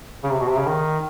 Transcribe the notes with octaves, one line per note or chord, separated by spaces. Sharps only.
C#3
C3
B2
C3
C#3
D#3